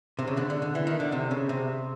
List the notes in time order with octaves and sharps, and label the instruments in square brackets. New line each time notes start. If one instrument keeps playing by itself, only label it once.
[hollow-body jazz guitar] C3
C#3
D3
D3
D3
E3
D#3
D3
C3
C#3
C3